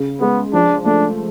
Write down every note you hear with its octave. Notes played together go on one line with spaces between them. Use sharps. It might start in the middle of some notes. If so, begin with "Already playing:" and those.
Already playing: C#3
G#3 B3
F3 D4
A3 D4